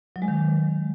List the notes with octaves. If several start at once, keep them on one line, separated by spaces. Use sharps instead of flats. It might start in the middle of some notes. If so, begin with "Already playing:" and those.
F#3
G#3
D#3